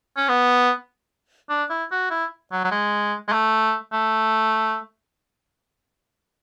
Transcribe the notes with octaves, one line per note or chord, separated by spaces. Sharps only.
C#4
B3
D4
E4
F#4
E4
F#3
F#3
G#3
G#3
A3
A3